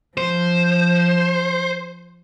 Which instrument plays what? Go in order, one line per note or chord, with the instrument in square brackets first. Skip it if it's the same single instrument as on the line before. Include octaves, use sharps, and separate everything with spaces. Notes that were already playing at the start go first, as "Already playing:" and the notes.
[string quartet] F3 [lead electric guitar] C5